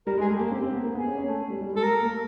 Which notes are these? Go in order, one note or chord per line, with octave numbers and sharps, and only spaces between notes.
G3 A#4
G#3
G#4
A3
G4
A#3
C4 G4
C4
B3
A#3
B3 G#4
C#4
C#4
A3
G3
G3
G#3
A4
A#4
A#3
A3